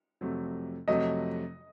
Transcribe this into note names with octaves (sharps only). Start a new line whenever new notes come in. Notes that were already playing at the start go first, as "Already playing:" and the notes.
F2 C3 F#3 A3
F2 C3 F#3 A3 D#5